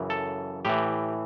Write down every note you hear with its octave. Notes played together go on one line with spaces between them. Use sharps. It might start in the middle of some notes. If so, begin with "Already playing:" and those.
Already playing: F#2 C#3 E3
A4
A2 E3 G4